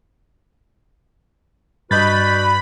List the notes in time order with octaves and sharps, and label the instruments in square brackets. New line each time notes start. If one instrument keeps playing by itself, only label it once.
[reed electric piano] G2 [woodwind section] D4 F#4 B4 [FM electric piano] D#5 G6 A6 [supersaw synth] B5